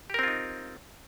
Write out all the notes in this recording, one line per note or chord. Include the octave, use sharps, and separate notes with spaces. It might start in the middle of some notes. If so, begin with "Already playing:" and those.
C4 D#4 F4 G4 A#4